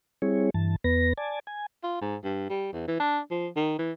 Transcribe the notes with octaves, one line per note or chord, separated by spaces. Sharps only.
G3 C4 E4 G#4 C#5
G2 E3 A5
E2 B3 B4 A#6
D5 G#5 A5
G#5
F4
G#2
G2
G3
E2
E3
D4
F3
D#3
E3